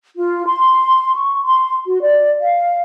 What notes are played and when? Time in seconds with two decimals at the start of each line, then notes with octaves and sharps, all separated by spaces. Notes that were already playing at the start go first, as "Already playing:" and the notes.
0.17 F4
0.47 C6
1.15 C#6
1.44 C6
1.87 F#4
2.01 D5
2.40 F5